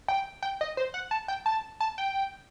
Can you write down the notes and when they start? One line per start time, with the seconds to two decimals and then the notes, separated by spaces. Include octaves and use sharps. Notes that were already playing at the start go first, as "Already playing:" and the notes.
0.08 G5
0.42 G5
0.61 D#5
0.77 C5
0.94 F#5
1.11 A5
1.28 G5
1.46 A5
1.80 A5
1.98 G5